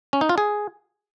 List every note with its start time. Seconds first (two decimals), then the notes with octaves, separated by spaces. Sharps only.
0.13 C#4
0.21 D#4
0.29 F4
0.38 G#4